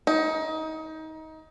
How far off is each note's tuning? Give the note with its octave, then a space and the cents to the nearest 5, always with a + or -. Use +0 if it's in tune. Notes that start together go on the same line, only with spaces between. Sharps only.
D#4 +25